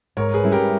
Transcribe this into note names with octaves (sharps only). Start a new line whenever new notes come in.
G#2 A#4 C#5
G#4 B4
G3 C#4 E4
G4 A#4